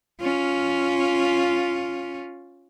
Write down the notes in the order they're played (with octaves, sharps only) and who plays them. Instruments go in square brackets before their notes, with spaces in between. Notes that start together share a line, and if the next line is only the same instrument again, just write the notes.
[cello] C#4 F4